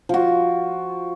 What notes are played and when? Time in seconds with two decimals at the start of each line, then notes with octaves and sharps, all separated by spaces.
0.09 F3 F#4